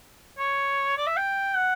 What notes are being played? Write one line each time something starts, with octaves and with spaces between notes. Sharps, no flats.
C#5
D5
E5
G5
F#5